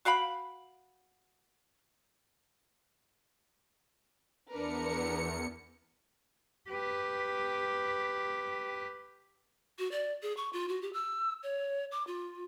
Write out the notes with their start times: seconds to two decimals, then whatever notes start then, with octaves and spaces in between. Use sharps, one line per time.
0.05 F#4 F5 G5 B5
4.51 E2 D4 A#4 B4 C#7
6.69 G4 B4
9.79 F#4
9.92 D5
10.23 G#4
10.37 C#6
10.53 F4
10.69 F#4
10.82 G4
10.93 E6
11.43 C#5
11.92 D6
12.07 F4